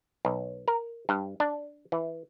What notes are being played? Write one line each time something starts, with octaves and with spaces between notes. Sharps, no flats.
B1
A#4
G2
D4
E3